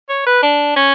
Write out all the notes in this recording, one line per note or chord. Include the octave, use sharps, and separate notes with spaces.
C#5
B4
D4
C#4